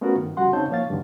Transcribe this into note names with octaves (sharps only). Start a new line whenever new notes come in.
A3 B3 C#4 F4 F#4 A#4
G2 D#3
F2 C#3 G3 F#4 F#5 C6
C#3 C4 D#4 C#5 A5 G6
F3 A#3 C#5 F5 A6
D2 G2 D3 D#3